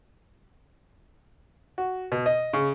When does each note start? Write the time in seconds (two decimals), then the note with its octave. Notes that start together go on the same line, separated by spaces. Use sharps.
1.78 F#4
2.12 B2
2.26 D#5
2.53 C#3